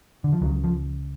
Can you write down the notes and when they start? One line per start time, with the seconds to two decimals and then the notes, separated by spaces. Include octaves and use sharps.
0.24 D3
0.33 F3
0.41 C#2 F#3
0.45 C#3
0.64 F3